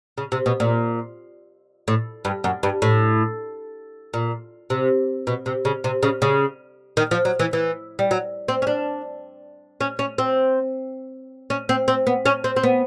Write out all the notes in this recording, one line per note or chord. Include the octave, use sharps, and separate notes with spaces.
C#3
C3
B2
A#2
A2
G2
F#2
G2
A2
A#2
C3
B2
C3
C#3
C3
C#3
C#3
D#3
F3
F#3
E3
E3
G3
F#3
C4
C#4
D4
C#4
C#4
C4
C#4
C4
C4
B3
C#4
C4
C4
B3